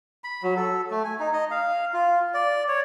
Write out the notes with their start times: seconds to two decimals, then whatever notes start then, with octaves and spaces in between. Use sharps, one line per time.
0.24 B5
0.43 F#3
0.57 A4
0.91 A3
1.04 G#5
1.20 D#4
1.33 D#5
1.51 F5
1.94 F4
2.34 D5
2.69 C#5